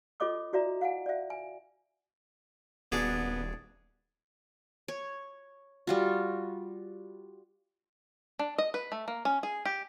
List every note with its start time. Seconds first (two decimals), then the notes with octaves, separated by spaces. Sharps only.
0.20 F4 A4 C#5 D#5 D6 D#6
0.53 E4 F#4 D5 E5 A#5
0.81 F5 F#5 G#5
1.06 D5 E5
1.30 G#5
2.92 D#1 B3 D4 F#4 G#4 G#6 A6
4.88 C#5
5.87 G3 F4 F#4
8.39 D4
8.58 D#5
8.74 B4
8.92 A3
9.08 A#3
9.25 C#4
9.43 G#4
9.65 G4